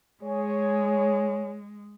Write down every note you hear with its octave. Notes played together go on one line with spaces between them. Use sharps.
G#3 G#4 C#5